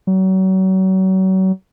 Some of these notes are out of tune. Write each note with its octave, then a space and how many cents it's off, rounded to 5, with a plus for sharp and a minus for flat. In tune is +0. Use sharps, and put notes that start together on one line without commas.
F#3 +35